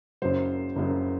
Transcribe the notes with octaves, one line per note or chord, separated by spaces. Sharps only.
F#1 F#2 C#3 F#3 C5
F#1 F#2 C#3 F#3